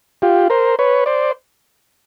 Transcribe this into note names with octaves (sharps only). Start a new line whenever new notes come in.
F4 G4
A#4 C5
B4 C#5
C5 D5